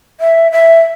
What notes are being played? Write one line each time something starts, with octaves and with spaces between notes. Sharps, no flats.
E5
E5